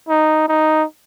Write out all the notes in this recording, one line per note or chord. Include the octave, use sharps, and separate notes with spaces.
D#4
D#4